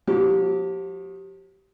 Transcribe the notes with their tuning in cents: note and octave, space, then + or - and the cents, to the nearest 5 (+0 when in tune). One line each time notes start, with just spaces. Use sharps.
F3 +40 G4 -20